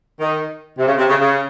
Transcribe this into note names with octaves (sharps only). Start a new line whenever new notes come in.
D#3
C3
C#3
C3
C#3
C#3